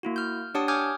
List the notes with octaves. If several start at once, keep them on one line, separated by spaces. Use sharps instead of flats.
A#3 E4 F#4
F6 G6
D4 G4 C#5 F#5 A5 D#6
G#5 D6 D#6 F6 G6 G#6